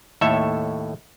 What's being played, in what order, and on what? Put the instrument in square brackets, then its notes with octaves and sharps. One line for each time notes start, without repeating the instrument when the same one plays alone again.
[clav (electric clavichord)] D#2 A2 A4 C#5 E5